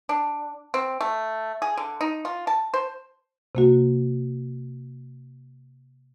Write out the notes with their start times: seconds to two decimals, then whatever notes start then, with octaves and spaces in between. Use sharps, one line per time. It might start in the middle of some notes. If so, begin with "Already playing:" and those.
0.09 D4
0.74 C4
1.01 A3
1.62 G#4
1.77 D3
2.01 D#4
2.25 F4
2.47 A5
2.74 C5
3.55 C3 A#3 F#4